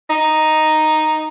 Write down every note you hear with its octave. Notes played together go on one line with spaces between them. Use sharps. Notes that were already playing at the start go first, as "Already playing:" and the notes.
D#4